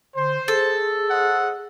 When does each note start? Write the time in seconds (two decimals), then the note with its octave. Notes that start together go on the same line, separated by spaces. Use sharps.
0.16 D3 C5
0.48 G#4 A4
1.11 C5 D#5 F#5